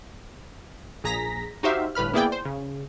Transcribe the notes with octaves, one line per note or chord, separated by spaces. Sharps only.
A#1 G#4 A#5 A#6 B6
D#4 F#4 G4 C5 E5 F5
G1 A2 B4 B5 F6
A#3 B3 E4 G#4 D5 G5
C5
C#3